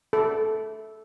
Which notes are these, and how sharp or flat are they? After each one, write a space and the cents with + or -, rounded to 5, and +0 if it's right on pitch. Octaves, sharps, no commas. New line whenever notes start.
A4 -10